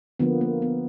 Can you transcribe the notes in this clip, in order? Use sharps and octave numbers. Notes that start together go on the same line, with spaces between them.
D3 F3 A#3 B3
A#3
B3